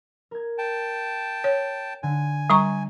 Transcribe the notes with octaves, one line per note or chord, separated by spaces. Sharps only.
A#4 G#6
G5 A5
C#5
D3 G#5
G3 A#5 C#6